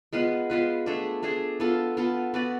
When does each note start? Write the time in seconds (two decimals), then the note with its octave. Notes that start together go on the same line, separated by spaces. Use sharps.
0.13 G#3 B3 F4 B4
0.50 G#3 B3 F4 B4
0.86 A3 D4 G#4
1.23 A3 D4 G#4
1.60 B3 F4 A4
1.97 B3 F4 A4
2.34 B3 F#4 B4 D5